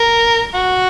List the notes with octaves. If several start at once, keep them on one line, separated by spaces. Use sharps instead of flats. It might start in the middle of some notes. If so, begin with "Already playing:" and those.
Already playing: A#4
F#4